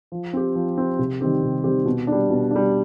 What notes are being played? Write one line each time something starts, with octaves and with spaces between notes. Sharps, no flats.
F3
C4 G4
F3
C4 G4
C3
D#3 G3 C4 G4
C3
D#3 G3 C4 G4
B2
G3 D4
B2
G3 D4